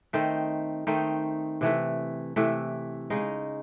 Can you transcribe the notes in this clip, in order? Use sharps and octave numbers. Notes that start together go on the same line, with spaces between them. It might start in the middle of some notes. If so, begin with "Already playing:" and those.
D#3 A3 C4 D#4
D#3 A3 C4 D#4
C3 E3 A3
C3 E3 A3
C#3 G#3 D#4